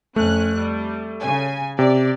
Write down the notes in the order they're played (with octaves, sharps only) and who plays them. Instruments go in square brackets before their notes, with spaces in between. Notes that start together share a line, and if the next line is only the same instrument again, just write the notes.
[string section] F2 C#4 F#6 [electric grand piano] A3
[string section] G3
C#3 G#5
[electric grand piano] C3 [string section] D5